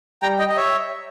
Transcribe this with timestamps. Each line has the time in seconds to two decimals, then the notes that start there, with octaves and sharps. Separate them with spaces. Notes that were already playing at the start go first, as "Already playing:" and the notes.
0.22 G3 G5 A#5
0.39 D#5 G5
0.49 D#5
0.56 C#5 E5